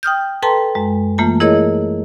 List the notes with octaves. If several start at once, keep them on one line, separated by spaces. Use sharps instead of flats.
G5 D#6 F6 G6
A4 B4 G5 A5 A#5 C6
F#2 G#3
E3 A3 A#3 F4 A5
E4 G#4 A#4 C#5 D#5